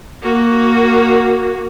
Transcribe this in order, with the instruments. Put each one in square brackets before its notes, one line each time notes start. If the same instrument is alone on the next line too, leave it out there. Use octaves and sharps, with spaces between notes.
[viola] A#3 F#4